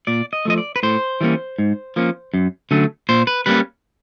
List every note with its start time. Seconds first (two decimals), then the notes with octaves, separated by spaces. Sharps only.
0.07 A#2 D5
0.33 D#5
0.45 F3 A3 D#5
0.58 D5
0.76 B4
0.83 A2 C5
1.21 E3 G3 A#3 C#4
1.59 G#2
1.96 F3 A#3 C#4
2.34 F#2
2.71 D3 F#3 A3 C#4
3.09 A#2 C5
3.27 B4
3.46 G3 A#3 C#4 B4